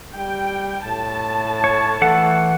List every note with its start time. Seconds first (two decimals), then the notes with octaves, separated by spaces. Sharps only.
0.16 G3 G5
0.85 A2 A5
1.64 C#5
2.01 E3 A3 A4 F#5